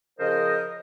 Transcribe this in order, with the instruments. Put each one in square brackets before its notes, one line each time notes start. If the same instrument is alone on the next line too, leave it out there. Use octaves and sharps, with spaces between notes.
[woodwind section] C#3 F3 A#4 C5 D#5